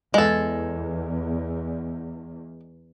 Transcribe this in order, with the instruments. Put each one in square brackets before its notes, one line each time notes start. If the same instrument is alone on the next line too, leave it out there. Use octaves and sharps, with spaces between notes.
[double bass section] E2 [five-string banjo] G#3 A4